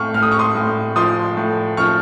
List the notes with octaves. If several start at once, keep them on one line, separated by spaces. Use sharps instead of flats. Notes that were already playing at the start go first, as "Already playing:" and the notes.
Already playing: A2 C4 C#6 F6
A2 F6
D#6
C#6
C6 D#6
A2
F3 C6 D#6
A2
F3 C#6 F6